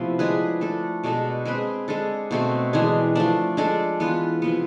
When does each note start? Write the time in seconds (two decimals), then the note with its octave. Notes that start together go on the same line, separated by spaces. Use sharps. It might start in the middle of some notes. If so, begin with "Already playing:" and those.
Already playing: C3 F3 A3 B3 E4
0.19 G#3 D4 G#4 B4
0.61 A3 D4 A4
1.04 B2 G#3 D4 A4
1.45 G#3 C4 G#4 B4
1.88 G#3 D4 A4
2.31 B2 A3 C4
2.73 E3 G#3 D4 G#4
3.15 F3 A3 D4
3.57 G#3 D4 A4
4.00 E3 B3 F4 B4
4.42 C3 F3 B3